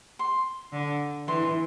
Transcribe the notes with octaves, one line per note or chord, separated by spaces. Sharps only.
C6
D3
E3 C6